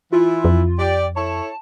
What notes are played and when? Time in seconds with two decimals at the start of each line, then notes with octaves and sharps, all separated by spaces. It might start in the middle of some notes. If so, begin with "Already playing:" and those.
0.12 E3 E4 F4
0.45 F2
0.79 G4 D5
1.16 E4 A4 C#5 A5